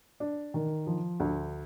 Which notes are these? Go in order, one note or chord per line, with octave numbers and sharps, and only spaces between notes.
D4
D#3
F3
D2